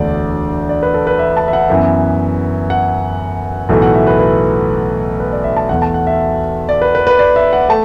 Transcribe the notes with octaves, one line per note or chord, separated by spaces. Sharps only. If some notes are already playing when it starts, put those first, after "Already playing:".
Already playing: E1 D2 D3 A3 D5
D5
B4
A4
B4
E5
A5
E5
F#5
F#2 E3 B3 E5
F#5
B1 A2 E3 A3
F#5
E5
B4
B4
B4
D5
E5
A5
E2 B2 A3 F#5
A5
F#5
E5
D5
B4
B4
B4
D5
E5
F#5
A3 A5